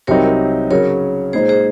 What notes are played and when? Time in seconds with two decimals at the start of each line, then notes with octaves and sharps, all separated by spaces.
0.07 C2 C3 F#3 C4 D#4 A#4 C#5
0.70 C#3 F#3 C#4 A#4 C#5
1.33 A#2 G#3 D#4 G#4 C5
1.49 G#4 C5